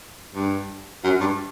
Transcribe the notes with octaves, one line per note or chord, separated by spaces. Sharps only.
G2
F#2
G2